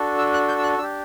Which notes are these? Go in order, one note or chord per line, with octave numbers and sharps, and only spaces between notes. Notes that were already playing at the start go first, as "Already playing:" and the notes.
Already playing: D4 F#4 A4
E6
F#6
G6
E6
F#6
D4 G4 E6